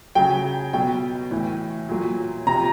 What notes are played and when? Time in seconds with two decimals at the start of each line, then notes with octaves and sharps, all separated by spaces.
0.15 C#3 F#3 G5
0.73 B2 F#3 G5
1.31 A2 E3
1.89 A#2 F#3
2.47 C3 F3 A#5